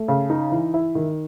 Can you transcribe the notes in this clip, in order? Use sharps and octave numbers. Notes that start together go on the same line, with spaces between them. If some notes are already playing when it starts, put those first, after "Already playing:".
Already playing: A3
C#3
D#4
E3
E4
D#3